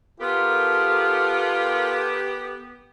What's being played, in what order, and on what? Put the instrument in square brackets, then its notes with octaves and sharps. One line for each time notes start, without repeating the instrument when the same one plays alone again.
[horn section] B3 G4 [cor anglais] F4 [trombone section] A4 A#4